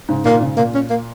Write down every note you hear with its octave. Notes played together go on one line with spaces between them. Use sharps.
G#2 C#3
A#2 D#3 A#3
G#2 C#3
A#2 A#3
C#4
A#3